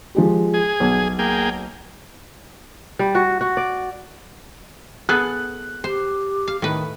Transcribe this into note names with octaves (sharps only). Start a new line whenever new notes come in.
F3 G#3 G4
G#4
B1
A#3 G#4 G5
G3
F#4
F#4
D5
B3 G#4 A4 F#6
G4 C5
F5
A2 D#3 B4